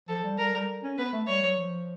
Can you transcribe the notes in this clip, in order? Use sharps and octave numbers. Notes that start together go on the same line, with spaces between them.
F3 A4
G3
G3 A#4
G3
C#4
B3 B4
A3
G3 C#5
F#3
F3